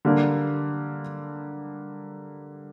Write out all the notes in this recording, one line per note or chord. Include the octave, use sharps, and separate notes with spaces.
D3 G3 A#3 D4